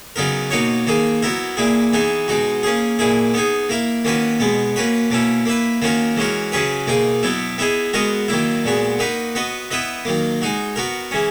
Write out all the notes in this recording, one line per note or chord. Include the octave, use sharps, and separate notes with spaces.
C#3 F#3 B3 D#4 A#4
B2 A#3 D#4 F#4 C#5
D#3 A#3 D#4 G#4
F#3 B3 E4 A#4
A#2 A#3 E4 G#4
E3 B3 D#4 G#4
B2 G#3 D#4 F#4
A#3 C#4 G#4
A#2 A#3 E4 G#4
B3 D#4 G#4
A#3 E4 A#4
D#3 A#3 C#4 F#4 B4
B2 G#3 B3
A#3 C#4 F#4 B4
B2 A#3 C#4 E4
A#3 E4 B4
D#3 A#3 C#4 F#4 A#4
E3 G#3 C#4 F#4 A#4
C#3 F#3 C#4 G#4 B4
B2 A#3 D#4 G#4
B2 F#3 B3 E4
B3 E4 G#4 D#5
G#3 B3 F#4 A#4 D#5
D#3 F#3 A#3 E4
A#2 G#3 B3 F#4
A#3 D#4 F#4 B4
B3 F#4 B4 D#5
B3 E4 B4 D#5
D#3 F#3 A#3
G#3 D#4 F#4
B3 F#4 A#4
E3 G#3 C#4